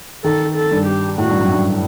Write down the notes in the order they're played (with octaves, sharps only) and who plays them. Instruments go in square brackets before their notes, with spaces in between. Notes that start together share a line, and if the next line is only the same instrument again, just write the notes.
[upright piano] D#3 [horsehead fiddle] A4
[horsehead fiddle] A4
[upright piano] G2
[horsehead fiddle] G4
[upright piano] A2 [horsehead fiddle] F#4
[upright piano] G2
F#2
G2